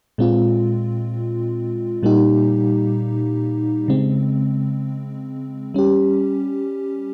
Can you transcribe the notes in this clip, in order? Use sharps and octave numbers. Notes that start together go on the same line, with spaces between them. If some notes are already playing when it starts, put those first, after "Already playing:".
A#2 G#3 C4 F4
A#2 G3 A#3 D#4 G4
C#3 G#3 C4
G3 C#4 G4